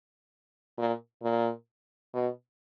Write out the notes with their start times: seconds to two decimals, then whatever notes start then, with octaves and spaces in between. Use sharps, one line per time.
0.78 A#2
1.23 A#2
2.14 B2